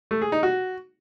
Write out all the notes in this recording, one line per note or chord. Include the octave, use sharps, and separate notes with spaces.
A3
G#4
D#4
F#4